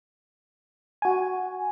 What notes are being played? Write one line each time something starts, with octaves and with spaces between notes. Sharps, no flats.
F#4 G#5